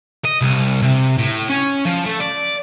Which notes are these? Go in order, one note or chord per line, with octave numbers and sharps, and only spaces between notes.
D#5
C2
C3
A2
C#4
F3
A3
D5